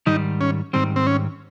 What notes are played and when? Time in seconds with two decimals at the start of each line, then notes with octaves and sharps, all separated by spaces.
0.06 G#2 D#3 G3 D#4
0.41 C#4
0.73 G#2 D#3 G3 C4
0.96 C4
1.07 C#4